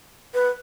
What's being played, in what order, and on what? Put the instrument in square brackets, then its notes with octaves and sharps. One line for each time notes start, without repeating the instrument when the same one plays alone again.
[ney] B4